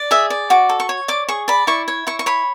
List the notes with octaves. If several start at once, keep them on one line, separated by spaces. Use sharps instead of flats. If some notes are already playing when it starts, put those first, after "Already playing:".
Already playing: D5
G#4 E5
D5
F#4 D6
A4
C#6
C#5
D5 D6
G#4 C#6
D5 B5
E4 C#6
C#5
E4 C#6
C#6
C#5 B5